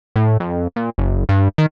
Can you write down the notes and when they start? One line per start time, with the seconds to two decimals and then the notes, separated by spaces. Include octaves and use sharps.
0.16 A2
0.40 F2
0.76 A#2
0.98 F#1
1.29 G2
1.58 D#3